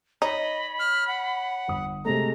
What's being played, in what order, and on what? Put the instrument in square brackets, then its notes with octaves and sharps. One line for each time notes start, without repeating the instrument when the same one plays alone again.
[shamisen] D#4 [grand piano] C#5 [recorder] D#5 [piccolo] B5
[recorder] F6
F#5
[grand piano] G1 D#6
[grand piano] C3 G#3 A3 [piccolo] A#5